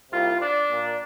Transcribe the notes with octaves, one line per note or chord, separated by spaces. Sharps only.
C2 C3 G3 A#3 F4
D4
A#2 A#3